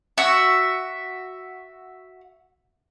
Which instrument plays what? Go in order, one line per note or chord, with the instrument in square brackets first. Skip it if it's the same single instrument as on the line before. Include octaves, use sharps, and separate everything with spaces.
[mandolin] F#4 E5